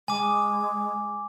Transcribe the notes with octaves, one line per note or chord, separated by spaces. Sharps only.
G#3 G#5 D6